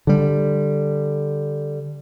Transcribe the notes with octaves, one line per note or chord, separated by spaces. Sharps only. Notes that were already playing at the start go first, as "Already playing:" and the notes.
D3 G3